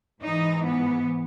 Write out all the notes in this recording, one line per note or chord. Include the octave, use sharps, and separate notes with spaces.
G#2 E3 D#4
B3